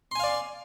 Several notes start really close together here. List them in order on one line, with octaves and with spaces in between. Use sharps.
C6 G#5 F5 D5